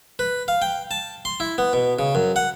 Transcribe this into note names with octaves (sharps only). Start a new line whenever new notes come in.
B4
F5
G5
A5
C6
E4
B3
B2
C#3
F#2
F#5